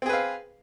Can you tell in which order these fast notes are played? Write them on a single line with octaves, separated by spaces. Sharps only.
C4 G#4 B4 F5